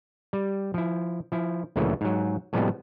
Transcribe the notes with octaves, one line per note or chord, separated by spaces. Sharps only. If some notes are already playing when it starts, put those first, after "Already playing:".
G3
F3 E4
F3 E4
D2 A#2 C#3 E3 F#3 A3
G#2 F#3
A2 C3 F3 G3 G#3 B3